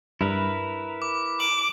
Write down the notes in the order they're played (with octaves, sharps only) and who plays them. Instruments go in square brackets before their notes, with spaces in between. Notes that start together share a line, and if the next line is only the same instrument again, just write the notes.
[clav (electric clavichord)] G2 [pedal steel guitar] E4 A#4 B4
[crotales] D6
[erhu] D6 [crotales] F#7